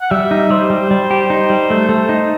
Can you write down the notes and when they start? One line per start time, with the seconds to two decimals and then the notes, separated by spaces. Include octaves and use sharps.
0.01 F#5
0.11 G3 E5
0.31 D#4
0.50 G3 C5
0.70 G3
0.91 G3
1.11 G4
1.30 D#4
1.50 G3
1.70 A3
1.89 A3
2.09 D#4